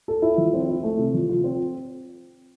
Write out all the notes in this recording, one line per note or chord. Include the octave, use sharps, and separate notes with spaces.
A4
E4
F3
C4
E4
A3
C3
F3
F4
C4